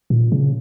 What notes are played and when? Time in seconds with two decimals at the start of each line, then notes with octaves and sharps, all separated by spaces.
0.10 A#2
0.32 C#3